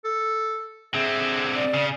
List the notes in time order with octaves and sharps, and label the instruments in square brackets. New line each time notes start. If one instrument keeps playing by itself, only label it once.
[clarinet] A4
[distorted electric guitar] D3 C4 [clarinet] G#4 [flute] E5
[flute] D5
[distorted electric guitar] C#3